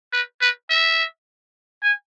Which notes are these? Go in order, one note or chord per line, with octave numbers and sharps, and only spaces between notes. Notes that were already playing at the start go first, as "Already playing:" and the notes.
B4
B4
E5
G#5